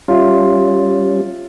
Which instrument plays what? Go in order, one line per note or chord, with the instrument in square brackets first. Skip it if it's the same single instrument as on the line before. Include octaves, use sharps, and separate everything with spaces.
[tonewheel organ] G3 C#4 [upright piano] F4 E5